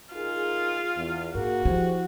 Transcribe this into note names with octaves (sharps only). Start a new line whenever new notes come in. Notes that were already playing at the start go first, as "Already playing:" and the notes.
D#4 F4 G#4 A#4
E2
G#2 A#3 F#4 G#4 A#4
F3 E4 G4 G#4 C5